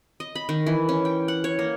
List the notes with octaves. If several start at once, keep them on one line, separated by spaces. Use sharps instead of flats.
D#5
B5
D#3
E3
C#4
G5
F#5
C#5
A#3